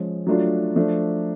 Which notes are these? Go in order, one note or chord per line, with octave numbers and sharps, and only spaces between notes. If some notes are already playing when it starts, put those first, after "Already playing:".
Already playing: F3 G#3 C#4
F#3 A3 D4 F4
F3 A3 D4